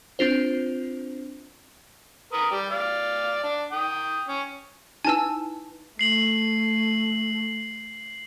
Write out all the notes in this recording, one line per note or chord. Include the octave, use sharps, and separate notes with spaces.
C4 D4 F4 C5
A#4 B4 D#6
G3 G4
D5 F5
D4
G5 D#6
C#4
D#4 E4 B4 G#5 A5 E6
A3 C7 F#7